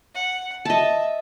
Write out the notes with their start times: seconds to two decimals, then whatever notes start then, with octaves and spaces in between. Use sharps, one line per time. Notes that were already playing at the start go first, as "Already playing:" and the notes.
0.14 F#5
0.65 D#5 E5 A5